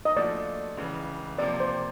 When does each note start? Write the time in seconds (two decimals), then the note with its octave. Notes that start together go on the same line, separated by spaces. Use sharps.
0.05 D#5
0.16 A#2 F3 A3 D4 F#4 D5
0.77 C#2 C#3 E3
1.39 C3 F3 A#3 D5
1.60 C5